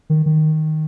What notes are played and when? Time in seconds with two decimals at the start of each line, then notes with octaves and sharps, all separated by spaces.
0.10 D#3
0.26 D#3